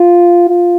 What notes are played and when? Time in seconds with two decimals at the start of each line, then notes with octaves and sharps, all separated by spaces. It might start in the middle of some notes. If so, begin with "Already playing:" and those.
Already playing: F4
0.49 F4